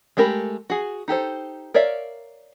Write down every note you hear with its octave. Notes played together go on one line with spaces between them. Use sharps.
G#3 A3 G4 A#4 B5
F#4 G#4
D#4 G4 A4 C5
A#4 C#5 D5 E5 F5